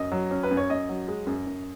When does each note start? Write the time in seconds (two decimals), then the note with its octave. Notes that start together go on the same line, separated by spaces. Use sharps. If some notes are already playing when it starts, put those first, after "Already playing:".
Already playing: F#2 D#5
0.12 F#3
0.31 C#4
0.43 B4
0.51 F#2
0.57 C#5
0.70 F#2 D#5
0.89 F#3
1.08 G#3
1.27 F#2
1.46 F#2